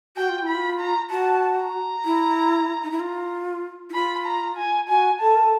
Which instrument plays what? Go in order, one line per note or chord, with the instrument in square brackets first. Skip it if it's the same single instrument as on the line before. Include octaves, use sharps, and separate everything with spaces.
[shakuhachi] F#4 [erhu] G5
[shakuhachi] F4
[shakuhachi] E4 [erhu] B5
[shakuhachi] F4
[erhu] A#5
[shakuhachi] F#4 [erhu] A5
[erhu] A#5
[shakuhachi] E4
D#4
E4
F4
E4
[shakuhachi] F4 [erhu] B5
[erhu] A#5
G#5
[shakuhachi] F#4 [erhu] G#5
[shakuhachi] A4 [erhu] A5
[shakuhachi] A#4
A4